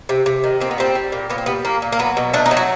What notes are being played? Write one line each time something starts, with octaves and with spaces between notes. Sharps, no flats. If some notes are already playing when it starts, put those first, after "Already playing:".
C3
C3
D#3
A#2 C4
B3
G3 C4
G3
A#2
A#2 B3
C4
G3 B3
A#2 A#3
A#2
A#3
F#3 B3
B2
A3 D4
D#4
F#3
F#4